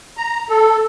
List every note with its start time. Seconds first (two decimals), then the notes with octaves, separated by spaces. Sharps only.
0.17 A#5
0.49 A4